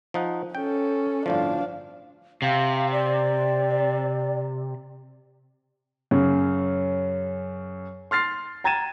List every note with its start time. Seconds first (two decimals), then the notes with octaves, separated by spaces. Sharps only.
0.14 F3 D#4 F#5
0.55 C#4 A4 G5
1.26 G1 A2 F3 D4 F5
2.42 C3 F5
2.91 D5
6.11 F#2 C#3
8.11 C6 F6 A6 C7
8.64 G5 A#5 G#6 A6 D#7 E7